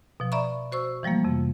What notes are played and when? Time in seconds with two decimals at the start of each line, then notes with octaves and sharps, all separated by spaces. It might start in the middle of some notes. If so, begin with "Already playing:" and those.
0.20 B2 F3
0.32 D5 E5 A#5 B5 C#6
0.72 F#4 C5 C#6 E6
1.03 E3 F3 G3 A3 A#3
1.24 F2 C3